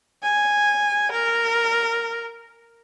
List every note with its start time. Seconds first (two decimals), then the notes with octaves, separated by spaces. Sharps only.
0.23 G#5
1.12 A#4